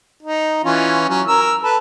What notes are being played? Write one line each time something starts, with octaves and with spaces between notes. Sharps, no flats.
D#4
E3 C#4 F4
F#3 C#4
A#4 E6
A4 B4